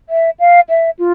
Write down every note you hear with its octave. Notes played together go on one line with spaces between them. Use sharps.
E5
F5
E5
F4